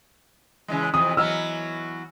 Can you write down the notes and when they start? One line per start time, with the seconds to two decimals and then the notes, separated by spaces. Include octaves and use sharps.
0.68 C#3 E3 G#3
0.94 F2 C3 E3 D#6
1.17 E3 F#3 B3 D#5 E6 F6